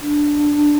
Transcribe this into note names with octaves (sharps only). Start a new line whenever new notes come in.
D4